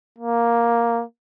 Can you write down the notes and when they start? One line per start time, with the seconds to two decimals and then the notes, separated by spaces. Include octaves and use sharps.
0.18 A#3